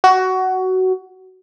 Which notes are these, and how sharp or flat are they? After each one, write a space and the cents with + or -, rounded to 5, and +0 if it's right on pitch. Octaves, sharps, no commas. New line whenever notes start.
F#4 +15